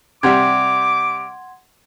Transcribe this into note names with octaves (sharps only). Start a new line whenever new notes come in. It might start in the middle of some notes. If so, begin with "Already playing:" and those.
C3 G3 F#5 C6 D6 G#6